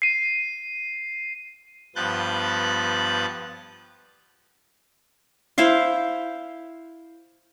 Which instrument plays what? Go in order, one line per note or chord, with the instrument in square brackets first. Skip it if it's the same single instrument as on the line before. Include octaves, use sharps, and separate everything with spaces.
[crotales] C7 D#7
[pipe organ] G2 F3 B3 F#6 G6 A6
[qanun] E4 C5 E5 F5